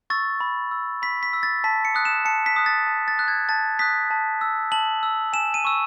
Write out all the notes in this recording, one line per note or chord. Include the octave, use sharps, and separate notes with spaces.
C#6 E6 A6
B5
E6
B5 B6
B6
E6
A6
A5 B6
C#7
D#6 F#6
E7
A5 C#7
B6
D#6 F#6
A6
A5
A6
D#6 F#6
G#6
A5 A6
D#6 F#6 B6
A5
E6
A5 F#7
E6
G#5 E7
D#7
C#6 E6